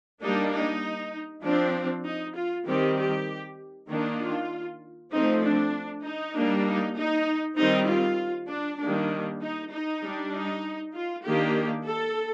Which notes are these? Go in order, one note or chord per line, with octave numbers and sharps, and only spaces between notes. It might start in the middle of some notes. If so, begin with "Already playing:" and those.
G3 A#3 D4 D#4
D#4
F3 C4 D4
D#4
F4
D#3 G3 C4 G4
G4
D#3 A#3 D4
F4
F3 A3 C4 D#4
D4
D#4
G3 A#3 D4
D#4
D#4
D#3 G3 C4 D#4
F4
D4
D#3 G3 A#3 D4
D#4
D#4
G3 D4
D#4
F4
D#3 A#3 D4 G4
A4